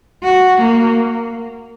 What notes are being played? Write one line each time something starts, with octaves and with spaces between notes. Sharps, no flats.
F#4
A#3